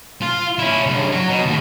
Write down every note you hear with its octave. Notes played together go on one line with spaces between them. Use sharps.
F4
C#4 E4
G2 C#3
F#3
B2
D#2 A2